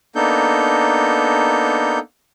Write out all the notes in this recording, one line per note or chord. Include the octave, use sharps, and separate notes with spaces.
A#3 B3 D4 D#4 A4 G6